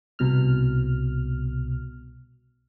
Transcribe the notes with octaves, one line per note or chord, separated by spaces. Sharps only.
C2 B2 F6